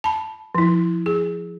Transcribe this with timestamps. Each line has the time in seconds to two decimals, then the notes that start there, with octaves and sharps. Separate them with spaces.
0.04 A5 B5
0.55 F3 E4
1.06 G#4